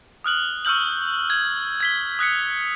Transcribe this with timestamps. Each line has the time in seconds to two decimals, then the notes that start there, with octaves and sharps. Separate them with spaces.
0.24 D#6 F6 F#6 F#7
0.65 C#6 E6 F6 G6 F#7
1.30 G#6 F#7
1.80 G#6 B6 G7
2.19 D#6 F#6 B6 C#7